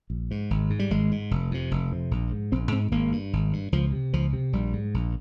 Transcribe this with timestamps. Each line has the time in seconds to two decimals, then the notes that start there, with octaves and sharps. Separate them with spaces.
0.10 A#1
0.31 G#2
0.50 G#1
0.70 G#2
0.79 G3
0.90 G#1 G#3
1.11 G#2
1.31 F1
1.51 F2 C3
1.71 F1
1.92 F2 C3
2.11 A#1
2.31 G#2
2.52 A#1 C4
2.72 G#2 C4
2.91 G#1 A#3
3.12 G2
3.33 G#1
3.53 G2
3.72 C#2 F3
3.92 C3
4.13 C#2 F3
4.33 C3
4.53 A#1 G3
4.73 G#2
4.94 A#1